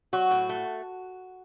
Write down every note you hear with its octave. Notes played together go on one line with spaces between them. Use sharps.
F#3 F#4
A2
A3